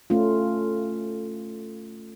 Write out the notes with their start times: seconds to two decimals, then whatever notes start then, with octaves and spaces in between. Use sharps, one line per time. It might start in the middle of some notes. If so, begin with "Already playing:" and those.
0.10 A3 C#4 F4